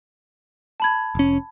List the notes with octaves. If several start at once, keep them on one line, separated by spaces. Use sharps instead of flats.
A5 B5 G#6
F1 C#4